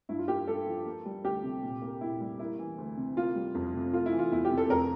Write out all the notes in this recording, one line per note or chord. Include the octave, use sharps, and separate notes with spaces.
G2 E4
F4
A#3 G4
G2 A4
F3
A#3
G3
D2 G4
C3
A#2
A#3
A#2 E4
G3
A#3 E4
E3
D2
C3
A#3 F4
G3
F2
C3
A3 F4
E4
E3
F4
E2 E4
G4
C3
A4
F2 A#4